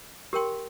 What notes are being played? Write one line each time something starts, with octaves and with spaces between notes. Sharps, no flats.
G4 A#4 G5 C6